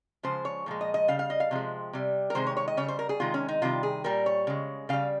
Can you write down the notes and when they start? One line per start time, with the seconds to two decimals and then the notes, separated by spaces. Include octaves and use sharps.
0.23 C#3 F3 G#3 C5
0.45 C#5
0.66 A#2 F3 G#3
0.81 D#5
0.94 D#5
1.08 C#3 G3 F5
1.19 F5
1.30 D#5
1.40 F5
1.51 C3 F3 G#3
1.93 C3 G3
2.30 A#4
2.35 C3 D#3 G#3 C5
2.47 C#5
2.57 C#5
2.68 D#5
2.77 C#3 G3 C#5
2.88 C5
2.99 A#4
3.09 G#4
3.20 C3 D#3 G#3 F4
3.34 C#4
3.48 D#4
3.62 C3 D#3 G3 F4
3.83 G#4
4.04 A#2 G3 A#4
4.26 C#5
4.47 C#3 G#3
4.89 C#3 G3 F5